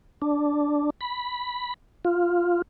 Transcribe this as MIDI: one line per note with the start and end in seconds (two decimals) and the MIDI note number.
0.22 0.90 62
1.01 1.74 83
2.05 2.62 65